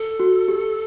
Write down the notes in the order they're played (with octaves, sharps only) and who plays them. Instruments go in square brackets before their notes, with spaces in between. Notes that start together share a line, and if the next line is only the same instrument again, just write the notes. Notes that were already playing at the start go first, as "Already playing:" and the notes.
Already playing: [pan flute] A4
[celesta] F#4
G4